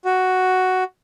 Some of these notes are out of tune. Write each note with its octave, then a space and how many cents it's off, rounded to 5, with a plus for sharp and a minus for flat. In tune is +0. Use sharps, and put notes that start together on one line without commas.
F#4 +5